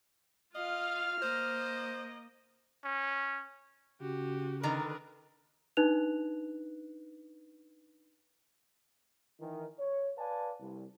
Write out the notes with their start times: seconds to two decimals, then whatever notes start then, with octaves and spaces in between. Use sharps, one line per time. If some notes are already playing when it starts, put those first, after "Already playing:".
0.55 F4 D#5 F5 F6
1.22 A#3 C5 D#5
2.84 C#4
4.01 C#3 F#4 G4
4.63 D3 D#3 A#4 B4 A#5
5.77 D4 D#4 B4 F#6 F7
9.40 D#3 E3
9.78 C#5
10.17 B4 D5 F5 G#5 A5
10.60 C2